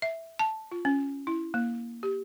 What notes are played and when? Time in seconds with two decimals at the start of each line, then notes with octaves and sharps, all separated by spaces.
0.02 E5
0.39 A5
0.72 F4
0.85 C#4
1.27 E4
1.54 A#3
2.03 G4